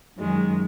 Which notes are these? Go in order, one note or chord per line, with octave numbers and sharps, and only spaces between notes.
F#2 D#3 G#3